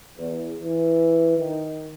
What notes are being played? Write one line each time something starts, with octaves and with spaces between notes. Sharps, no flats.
E2
E3
D#3